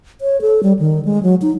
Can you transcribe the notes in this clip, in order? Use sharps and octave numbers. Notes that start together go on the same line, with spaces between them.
C#5
A4
G3
D#3
G#3
F#3
D#4